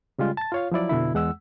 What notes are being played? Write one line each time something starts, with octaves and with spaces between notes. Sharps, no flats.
C#3 G3 G#3 F4
A5 A6
F4 C#5 F5
F3 F#3 E4 D5
F2 B2 D3 E4
E2 G#3 F#5 E6